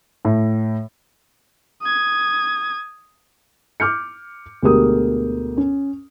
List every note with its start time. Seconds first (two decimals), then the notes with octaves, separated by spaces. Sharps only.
0.25 A2
1.82 D#6 G#6
3.80 D6 F6 G6 C#7
4.62 D2 B2 G#3 G4 A#4 D#6
5.57 C#4